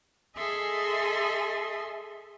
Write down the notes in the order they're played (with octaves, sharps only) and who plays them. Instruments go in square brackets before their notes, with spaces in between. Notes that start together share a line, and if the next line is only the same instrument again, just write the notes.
[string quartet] G#4 A4 D#5 E5 G#5 C6